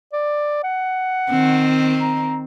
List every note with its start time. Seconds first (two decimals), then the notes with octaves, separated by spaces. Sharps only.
0.13 D5
0.64 F#5
1.30 D#3 C4
2.00 A#5